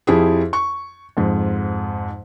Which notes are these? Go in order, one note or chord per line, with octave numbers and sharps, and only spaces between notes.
F2 E4 G4 G#4
C#6
F2 G#2